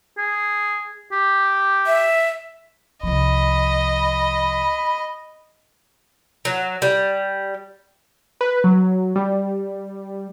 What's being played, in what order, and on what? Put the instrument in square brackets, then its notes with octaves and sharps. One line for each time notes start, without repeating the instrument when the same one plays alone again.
[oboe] G#4
G4
[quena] E5
[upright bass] C2 F3 [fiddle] D#5 [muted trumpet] B5
[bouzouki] F#3
G3
[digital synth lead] B4
F#3
G3